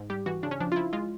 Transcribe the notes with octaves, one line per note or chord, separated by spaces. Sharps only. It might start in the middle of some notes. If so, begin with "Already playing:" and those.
Already playing: G#2
G3 G4
E3 F#4
C#3 D4
C#4
F3 D4
F4
F3 E4
G#3 F4